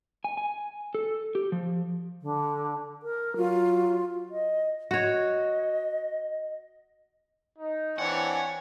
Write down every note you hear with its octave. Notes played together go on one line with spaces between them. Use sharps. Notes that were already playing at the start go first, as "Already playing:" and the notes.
G#5
G#5
A4
G4
F3
D3
A#4
F#3 F4
D#5
F#4 C#5 D#5
D#4
E3 C4 D4 C#5 F#5 G#5